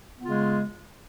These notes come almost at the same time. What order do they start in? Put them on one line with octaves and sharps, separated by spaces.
B3 F4 C#3 G#3